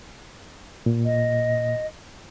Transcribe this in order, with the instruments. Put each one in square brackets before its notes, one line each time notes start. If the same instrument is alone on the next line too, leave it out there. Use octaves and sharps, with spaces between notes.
[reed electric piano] A#2
[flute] D#5